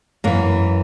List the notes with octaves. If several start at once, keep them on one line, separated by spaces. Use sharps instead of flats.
F#2 E3 A#3